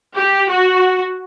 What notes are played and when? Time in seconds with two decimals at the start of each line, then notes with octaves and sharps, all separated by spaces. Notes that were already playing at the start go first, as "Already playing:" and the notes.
0.16 G4
0.49 F#4